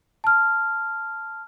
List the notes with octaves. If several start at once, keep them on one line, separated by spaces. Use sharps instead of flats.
A5 F6